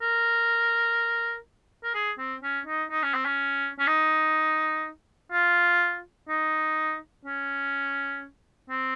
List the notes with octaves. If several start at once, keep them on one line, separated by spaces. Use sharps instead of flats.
A#4
A#4
G#4
C4
C#4
D#4
D#4
C#4
C4
C#4
C#4
D#4
F4
D#4
C#4
C4